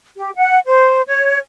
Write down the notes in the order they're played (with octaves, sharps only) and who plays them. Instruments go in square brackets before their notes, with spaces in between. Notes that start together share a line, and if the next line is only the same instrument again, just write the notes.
[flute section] G4
F#5
C5
C#5